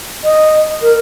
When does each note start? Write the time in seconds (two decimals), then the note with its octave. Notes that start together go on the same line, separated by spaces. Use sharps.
0.24 D#5
0.82 A#4